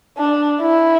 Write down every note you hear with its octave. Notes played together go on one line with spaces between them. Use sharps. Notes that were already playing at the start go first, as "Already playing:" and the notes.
D4
E4